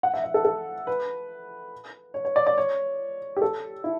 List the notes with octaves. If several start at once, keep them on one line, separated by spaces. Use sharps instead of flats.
F#5
E5
E5
A4
A4
B4
C#5
C#5
D5
D5
C#5
G4
A4
E4